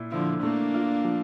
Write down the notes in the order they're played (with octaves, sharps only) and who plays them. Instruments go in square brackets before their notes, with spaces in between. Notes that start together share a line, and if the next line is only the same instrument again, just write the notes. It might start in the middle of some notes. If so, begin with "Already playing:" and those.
Already playing: [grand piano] A#2 E4
[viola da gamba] D3 F3 [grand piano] E4
[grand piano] A3 [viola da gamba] A#3 D4
[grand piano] F4
F3